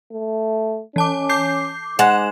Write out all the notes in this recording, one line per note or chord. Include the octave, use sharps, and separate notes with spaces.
A3
E3 C#4 A5 D6
D6 G6 C7
G#2 G#3 F#5 E7